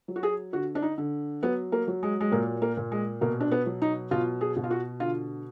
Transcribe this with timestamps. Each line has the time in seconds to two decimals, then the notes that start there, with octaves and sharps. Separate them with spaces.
0.08 F#3
0.16 F#4
0.23 G#4
0.53 D3 F#4
0.75 D4
0.82 D#4
0.98 D3
1.43 F#3 B3
1.72 A#3
1.87 F#3
2.03 G#3
2.21 G#3
2.32 A#2 A#3
2.62 A#3
2.77 A#2
2.92 G#3
3.21 B2 A#3
3.40 D4
3.51 B3
3.66 F#3
3.82 D#4
4.11 B2 F4
4.41 G#4
4.56 B2
4.64 F4
4.71 F#4
5.00 D3 F4